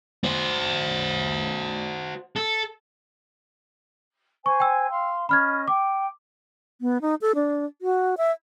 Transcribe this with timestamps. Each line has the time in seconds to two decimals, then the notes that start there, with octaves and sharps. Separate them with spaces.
0.24 F#4 C5
2.36 A4
4.46 C5 G#5 C#6
4.60 G5 E6
4.89 F5 C6
5.29 C#4 D#5 B5 F6 G#6
5.68 G5 D6
6.81 B3
7.02 D#4
7.21 A4
7.35 D4
7.82 F#4
8.18 E5